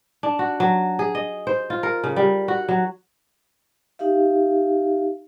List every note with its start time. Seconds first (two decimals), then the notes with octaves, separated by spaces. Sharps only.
0.23 D4
0.39 F#4
0.60 F#3
0.99 G#4
1.15 D#5
1.47 C5
1.70 F4
1.83 A#4
2.04 C#3
2.16 G3
2.48 F#4
2.69 F#3
3.99 D#4 G4 E5 F5